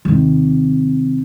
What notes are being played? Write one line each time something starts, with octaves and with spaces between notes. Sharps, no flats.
D#2 C3